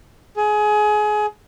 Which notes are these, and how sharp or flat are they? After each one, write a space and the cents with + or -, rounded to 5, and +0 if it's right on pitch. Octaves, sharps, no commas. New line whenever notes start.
G#4 +25